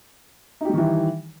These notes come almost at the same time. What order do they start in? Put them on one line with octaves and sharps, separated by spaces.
D#4 G4 G3 D#3 E3